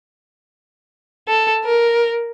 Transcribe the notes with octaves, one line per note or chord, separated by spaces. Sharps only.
A4
A#4